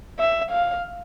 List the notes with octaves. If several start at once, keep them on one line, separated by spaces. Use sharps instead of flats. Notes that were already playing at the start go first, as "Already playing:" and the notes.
E5
F5